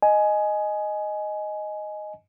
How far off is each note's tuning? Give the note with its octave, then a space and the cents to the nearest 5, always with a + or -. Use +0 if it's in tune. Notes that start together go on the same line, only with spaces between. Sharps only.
D#5 -5 G#5 +15